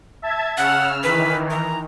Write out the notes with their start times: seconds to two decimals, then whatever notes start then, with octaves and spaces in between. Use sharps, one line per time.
0.22 E5 A5 G#6
0.58 C#3 F#5 E6 F6
1.03 D#3 E3 B4
1.50 A#5